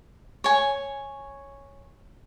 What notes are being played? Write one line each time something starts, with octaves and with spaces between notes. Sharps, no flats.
C#5 G#5